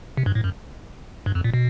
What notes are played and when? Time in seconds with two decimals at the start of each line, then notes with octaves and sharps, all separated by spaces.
0.17 C3
0.26 G2
0.35 A2
0.44 F#2
1.26 G2
1.35 F2
1.44 A#2
1.54 B2